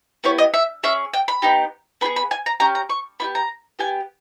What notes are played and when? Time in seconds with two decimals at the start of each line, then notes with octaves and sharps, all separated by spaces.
0.24 B3 E4 G4 C#5
0.38 D#5
0.54 E5
0.83 C#4 G#4 E5
1.14 G5
1.28 B5
1.42 B3 D#4 G4
2.01 B3 D#4 G#4 B5
2.16 B5
2.31 G#5
2.46 A#5
2.60 C#4 G4 A#5
2.75 A#5
2.90 C#6
3.20 B3 E4 G4 B5
3.35 A#5
3.79 B3 G4 G#5